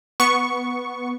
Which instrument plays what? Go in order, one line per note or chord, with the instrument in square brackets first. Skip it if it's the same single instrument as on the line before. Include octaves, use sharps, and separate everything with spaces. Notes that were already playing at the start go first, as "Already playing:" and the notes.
[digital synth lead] B3 [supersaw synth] C#6